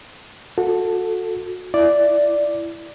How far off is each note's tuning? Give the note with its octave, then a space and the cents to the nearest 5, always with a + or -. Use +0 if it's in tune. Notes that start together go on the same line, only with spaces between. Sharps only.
F#4 -25 A4 +0
E4 +15 D5 +0